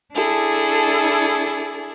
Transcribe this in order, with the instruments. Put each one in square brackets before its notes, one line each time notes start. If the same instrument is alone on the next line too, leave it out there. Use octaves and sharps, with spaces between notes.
[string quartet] D4 E4 G#4 A4